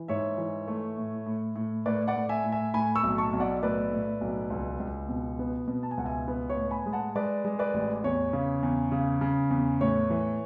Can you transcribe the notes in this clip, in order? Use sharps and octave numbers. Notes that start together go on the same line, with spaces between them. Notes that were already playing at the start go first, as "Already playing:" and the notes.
Already playing: E3
G#2 C#5 E5
E3
A3
A2
A2
A2
A2 B4 D5
D5 F#5
A2
E5 G#5
A2
E5 G#5
A2 G#5 B5
C#6 E6
B1
A5 C#6
B1
D5 F#5
A2 B4 D5
A2
B1
C#2
C#2
B2
B3
B2
A5
G#5
C#2 F#5
E5 G#5
B3
C#5
A2
G#5 B5
G#3
F#5 A5
G#3 B4 D5
G#3
B4 D5
A1
E2 C#5
C#3
E2
C#3
C#3
E2
A2 C#5
E3